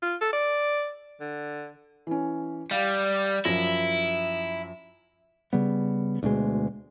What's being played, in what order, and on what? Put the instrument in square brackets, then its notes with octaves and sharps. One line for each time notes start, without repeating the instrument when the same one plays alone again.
[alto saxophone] F4
A4
D5
D3
[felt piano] E3 C#4
[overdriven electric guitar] G3 [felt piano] F5
[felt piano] F#2 F3 A#6 [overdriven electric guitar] E4
[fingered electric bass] C#3 G3 B3
D2 B2 G#3